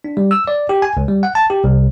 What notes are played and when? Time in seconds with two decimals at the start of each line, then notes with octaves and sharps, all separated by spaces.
0.04 D4
0.17 G3
0.31 E6
0.47 D5
0.69 G4
0.82 G#5
0.97 C#2
1.08 G3
1.23 F#5
1.35 A5
1.50 G4
1.64 C2